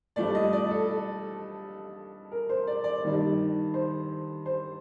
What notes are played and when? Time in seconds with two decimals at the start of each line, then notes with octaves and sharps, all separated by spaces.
0.16 G2 F3 A3 D5
0.35 D#5
0.53 D5
0.71 A4
2.32 A#4
2.49 C5
2.67 D5
2.84 D5
3.02 G2 D#3 G3 D5
3.74 C5
4.46 C5